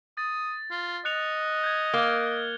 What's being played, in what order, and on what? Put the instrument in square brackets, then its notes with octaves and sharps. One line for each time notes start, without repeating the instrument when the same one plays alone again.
[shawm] D#6 [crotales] A6
[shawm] F4
[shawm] D#5 [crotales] F#6 C#7 F7
[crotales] G6 G#6
[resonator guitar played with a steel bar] A#3 [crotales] G7